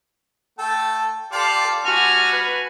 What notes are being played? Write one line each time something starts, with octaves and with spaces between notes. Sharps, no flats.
A3 A4 G5
F4 G4 A4 D5 F5
G3 F#4 G#5 F6
B4